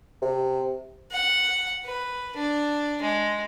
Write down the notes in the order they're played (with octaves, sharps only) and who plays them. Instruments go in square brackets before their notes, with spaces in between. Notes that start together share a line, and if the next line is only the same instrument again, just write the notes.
[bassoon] C3
[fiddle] F#5
B4
D4
G#3